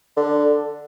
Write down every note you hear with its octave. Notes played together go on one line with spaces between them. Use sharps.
D3